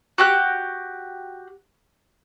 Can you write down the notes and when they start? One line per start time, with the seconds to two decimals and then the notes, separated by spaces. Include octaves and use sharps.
0.18 F#4 G4 F#6